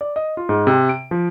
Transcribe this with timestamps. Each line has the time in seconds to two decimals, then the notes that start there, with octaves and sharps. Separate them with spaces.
0.01 D5
0.16 D#5
0.37 F4
0.49 G#2
0.67 C3
0.89 D7
1.11 F3